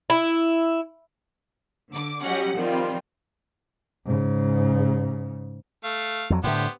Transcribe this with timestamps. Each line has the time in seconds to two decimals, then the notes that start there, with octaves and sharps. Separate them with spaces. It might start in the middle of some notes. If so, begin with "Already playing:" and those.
0.10 E4
1.92 D3 D6
2.25 F#3 G3 C#4 G4 D#5 F#5
2.56 D#3 F3 G3 C4 F4
4.05 G#2 C#3
5.84 A3 F5
6.30 F2 F#3
6.44 A2 D3 B3 G4 C5